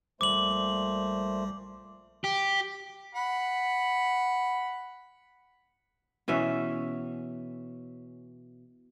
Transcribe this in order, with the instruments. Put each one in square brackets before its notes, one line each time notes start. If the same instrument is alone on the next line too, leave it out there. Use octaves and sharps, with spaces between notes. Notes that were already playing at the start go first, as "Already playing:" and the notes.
[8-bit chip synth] A#1 G3 [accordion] A#2 A3 C5 [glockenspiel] D6 F#7
[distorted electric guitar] G4
[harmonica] F#5 B5
[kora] B2 E3 C#4 E5